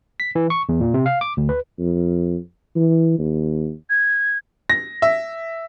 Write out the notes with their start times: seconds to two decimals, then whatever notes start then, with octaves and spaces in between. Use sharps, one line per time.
0.20 B6
0.35 E3
0.50 C#6
0.69 E2
0.80 A#2
0.94 C3
1.06 F5
1.21 D6
1.37 D2
1.49 B4
1.79 F2
2.76 E3
3.19 D#2
3.89 G#6
4.70 A#6
5.02 E5